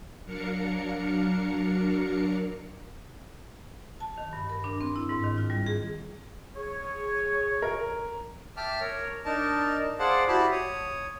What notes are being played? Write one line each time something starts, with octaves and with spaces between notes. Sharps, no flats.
F#3 D4 A#4 F5 C#7
A5
D#3
G2
A#4
D4
C4
E4
G#2
D#3
F4
G3
G#4
G#4 C#5
A#4
E5 G5 A5 D6 F6
A#4 C#5
D4 D#4 A#4 A5
G#4 C5 D5 F5 F#5 A5
E4 F#4 G4 A5 B5
C#5 D#6